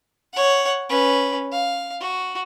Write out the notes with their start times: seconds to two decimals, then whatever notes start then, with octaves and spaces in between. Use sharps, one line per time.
0.33 C#5 F#5
0.90 C#4 B4
1.52 F5
2.00 F#4